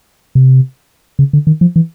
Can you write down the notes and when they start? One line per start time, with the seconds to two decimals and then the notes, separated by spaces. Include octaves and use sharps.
0.35 C3
1.19 C#3
1.33 D3
1.47 D#3
1.61 F3
1.76 E3